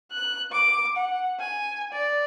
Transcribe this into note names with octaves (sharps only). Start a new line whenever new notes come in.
F#6
D6
F#5
G#5
D5